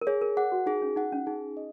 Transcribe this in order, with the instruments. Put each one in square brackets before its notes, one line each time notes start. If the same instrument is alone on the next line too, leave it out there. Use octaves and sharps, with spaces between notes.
[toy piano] A#4
[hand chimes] G#4 [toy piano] C#5
[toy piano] A#4
[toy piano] G#4 [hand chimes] F#5
[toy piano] F#4
[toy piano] D#4 [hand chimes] G#4
[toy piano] C#4
[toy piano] D#4 [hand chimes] F#5
[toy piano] C#4
[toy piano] D#4 [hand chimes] G#4
[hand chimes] D#5